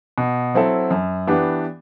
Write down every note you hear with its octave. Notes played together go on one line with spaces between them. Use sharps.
B2
F#3 C4 E4 A4
F#2
E3 B3 D4 G4